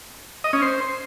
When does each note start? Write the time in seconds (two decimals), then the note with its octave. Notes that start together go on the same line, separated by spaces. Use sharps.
0.44 D#5
0.53 C#4
0.62 C5